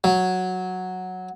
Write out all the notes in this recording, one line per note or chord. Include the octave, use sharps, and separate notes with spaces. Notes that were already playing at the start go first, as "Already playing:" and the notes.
F#3